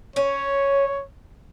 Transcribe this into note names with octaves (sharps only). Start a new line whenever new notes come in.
C#4 C#5